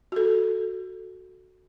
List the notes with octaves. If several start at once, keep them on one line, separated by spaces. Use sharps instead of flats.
F#4 A4